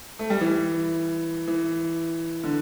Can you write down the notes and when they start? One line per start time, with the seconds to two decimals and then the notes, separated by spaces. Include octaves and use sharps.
0.19 A3
0.30 G3
0.41 E3
1.47 E3
2.44 D3